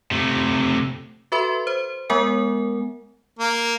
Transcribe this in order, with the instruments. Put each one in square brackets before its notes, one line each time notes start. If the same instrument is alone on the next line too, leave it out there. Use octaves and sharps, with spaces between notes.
[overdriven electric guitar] C3 A3
[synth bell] F#4 A4 B4 E5 B5 C6
C5
G#3 B3 A#4 F#5 G#5
[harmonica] A#3